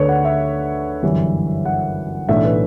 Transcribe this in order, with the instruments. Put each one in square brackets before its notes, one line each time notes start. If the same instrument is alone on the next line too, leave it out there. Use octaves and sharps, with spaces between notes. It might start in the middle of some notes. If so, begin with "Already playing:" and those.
Already playing: [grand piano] D2 D3 A3 D4 B4 C#5
F#5
E5
G1 F#2 E3 G3
F#5
B1 A2 E3 A3 D4 E5
B4